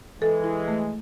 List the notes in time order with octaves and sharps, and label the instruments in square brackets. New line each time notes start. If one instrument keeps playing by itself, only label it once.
[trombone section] E3 G#3 [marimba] A4
[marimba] E4
A3